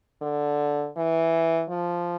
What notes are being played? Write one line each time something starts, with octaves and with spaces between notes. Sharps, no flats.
D3
E3
F3